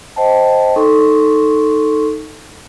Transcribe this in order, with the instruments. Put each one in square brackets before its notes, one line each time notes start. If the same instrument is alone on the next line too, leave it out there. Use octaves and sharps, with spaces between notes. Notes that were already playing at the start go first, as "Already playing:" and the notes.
[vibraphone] C5 D#5 G5 A5
D#4 A4 C6 C#6